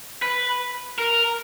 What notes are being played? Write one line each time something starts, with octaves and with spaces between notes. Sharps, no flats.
B4
A#4